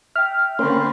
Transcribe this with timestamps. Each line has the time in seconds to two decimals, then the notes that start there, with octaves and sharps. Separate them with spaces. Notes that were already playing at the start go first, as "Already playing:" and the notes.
0.16 E5 G5 F6
0.59 D3 A#3 C4 C#4 B5 C6